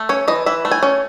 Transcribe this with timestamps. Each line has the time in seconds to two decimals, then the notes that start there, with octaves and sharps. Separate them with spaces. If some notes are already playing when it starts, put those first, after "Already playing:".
Already playing: A3
0.09 C#4 C#5
0.28 E3 D#5
0.46 E3 E5
0.65 A3
0.71 G#5
0.83 C#4